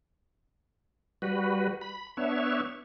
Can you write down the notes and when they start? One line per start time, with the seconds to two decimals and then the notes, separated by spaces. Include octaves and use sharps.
1.22 G3 F#4 B4
1.81 B5
2.17 B3 D4 C#5 E5